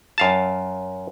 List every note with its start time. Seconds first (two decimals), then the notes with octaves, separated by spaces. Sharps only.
0.18 F#2 F5 A5